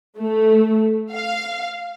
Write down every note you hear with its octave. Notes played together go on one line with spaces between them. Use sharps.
A3
F5